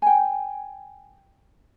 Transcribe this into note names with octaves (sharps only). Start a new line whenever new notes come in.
G5 G#5